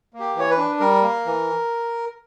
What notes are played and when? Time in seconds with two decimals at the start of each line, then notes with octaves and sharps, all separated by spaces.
0.14 A#3
0.20 G4
0.35 E3 C#5
0.50 B4
0.57 D4
0.80 G3 A#4
1.02 A#3
1.26 E3